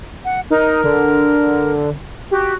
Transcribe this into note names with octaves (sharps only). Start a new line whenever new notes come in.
F#5
D#4 A#4
D3
F#4 G4